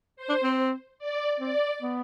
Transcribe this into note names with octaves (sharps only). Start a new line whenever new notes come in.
C5
D4
C4
D5
C4 D5
B3